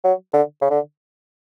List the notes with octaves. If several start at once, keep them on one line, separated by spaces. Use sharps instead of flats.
F#3
D3
C#3
D3